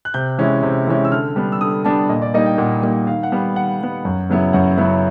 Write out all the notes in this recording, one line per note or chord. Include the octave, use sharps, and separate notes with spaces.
F#6
C3 G6
E3 G#3 C#4 E4
C3
E3 G#3 C#4 E4
E6
D3 F6
G3 B3 D4
E6
D3 D#6
G3 B3 D4 A5
A#2 D#5
D5
G3 A#3 D#4 D#5
G5
A#2 F#5
G3 A#3 D#4
D#3 F5
F#5
G3 B3
F#5
D#3 F#5
G3 B3
F#2
C#3 F#3 B3 E4
F#2 F#5
C#3 F#3 B3 E4